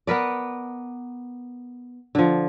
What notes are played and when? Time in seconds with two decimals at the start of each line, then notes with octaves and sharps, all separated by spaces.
0.07 B3 A#4 B4 D5
2.15 D3 F3